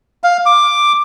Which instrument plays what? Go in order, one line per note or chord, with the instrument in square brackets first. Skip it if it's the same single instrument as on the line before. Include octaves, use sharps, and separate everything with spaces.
[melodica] F5
D6